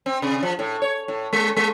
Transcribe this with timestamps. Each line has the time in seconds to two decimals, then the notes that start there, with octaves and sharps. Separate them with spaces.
0.06 C4
0.22 C3
0.43 F3
0.59 A2
0.82 C#5
1.08 A2
1.33 G#3
1.56 G#3